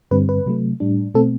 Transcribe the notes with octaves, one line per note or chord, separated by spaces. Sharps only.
G2 D3 G3 C4 B4
B4
C3 F#3 A3
A2 G3 D4
B2 A3 C4 A4